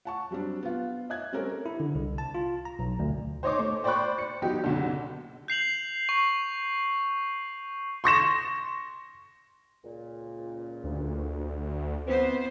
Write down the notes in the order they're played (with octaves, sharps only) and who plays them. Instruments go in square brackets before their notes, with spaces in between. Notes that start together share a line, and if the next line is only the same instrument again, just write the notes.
[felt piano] F#5 A5 C#6
F#3 G3 C4 D4
B3 F4
D#5 E5 F#6 G#6
G3 C4 C#4 G4 A4 A#4
[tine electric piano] E4
D3
C2
A5
F4
A#5
B1
D2
[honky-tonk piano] C5 C#5 D#5 C6 D6
A3
C5 D5 G5 B5 C#6 F#6
C#7
E2 F#3 D#4 G4
F#1 B1 D3
[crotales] G6 C7 F7 F#7
C#6
[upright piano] C6 C#6 A#6 E7
[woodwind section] C#2 A#2
[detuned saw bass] D2
[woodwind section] E3 [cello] B3 C5 [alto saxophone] C4